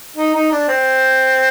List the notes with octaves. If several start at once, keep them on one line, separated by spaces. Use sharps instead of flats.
D#4
D#4
D4
C4